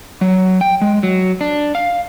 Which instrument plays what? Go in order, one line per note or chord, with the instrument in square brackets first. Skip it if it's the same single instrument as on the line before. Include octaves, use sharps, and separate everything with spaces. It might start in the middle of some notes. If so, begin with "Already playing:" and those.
[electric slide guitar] F#3
G5
G#3
F#3
D4
F5